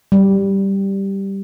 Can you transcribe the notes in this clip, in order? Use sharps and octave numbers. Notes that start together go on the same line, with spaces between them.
G3